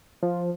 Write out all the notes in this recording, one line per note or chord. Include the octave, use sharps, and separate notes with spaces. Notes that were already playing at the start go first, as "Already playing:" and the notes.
F3